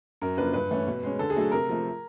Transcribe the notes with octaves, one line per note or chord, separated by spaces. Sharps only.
F#2 A#4
C#3 F3 A#3 D4 B4
G2 B4
E3 A3 C#4
B2
G#3 C#4
D3 A4
G#4
F#3 A3 D4 A4
C3 A#4
F3 A3